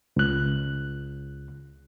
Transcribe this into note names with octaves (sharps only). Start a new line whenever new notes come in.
C#2 F#6